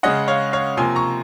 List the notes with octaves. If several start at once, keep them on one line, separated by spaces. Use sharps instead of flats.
C#3 G#3 C#4 D#5 F#5
C#5 F5
C#5 F5
C3 F3 A#3 G#5 C6
A#5 C#6